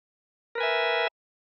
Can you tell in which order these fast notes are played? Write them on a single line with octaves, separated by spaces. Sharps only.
A#4 B4 G#5 E5